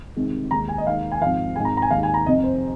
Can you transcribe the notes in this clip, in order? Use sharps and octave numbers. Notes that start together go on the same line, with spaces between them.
C2 C3 D#3 G#3
D#2 D#3 G#3 A#5
G#5
D#5
D#2 D#3 G#3 F5
G#5
G#1 G#2 F3 F5
G#1 G#2 G#3 G#5
A#5
A#5
G#5
D#2 D#3 G#3 F5
G#5
A#5
F1 F2 C3 D#5
C5